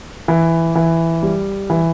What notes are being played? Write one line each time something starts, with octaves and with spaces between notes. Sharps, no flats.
E3
E3
G3
E3